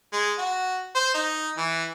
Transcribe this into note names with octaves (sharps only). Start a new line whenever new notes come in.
G#3
F#4
C5
D#4
E3